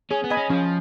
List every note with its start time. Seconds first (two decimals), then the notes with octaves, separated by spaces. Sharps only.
0.11 C#4 G#4
0.24 B3
0.30 D#5 G#5 B5
0.37 C#4
0.50 F3 C#4